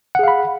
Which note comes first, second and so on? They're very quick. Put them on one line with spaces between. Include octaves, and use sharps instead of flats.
F#5 G#4 F5 B5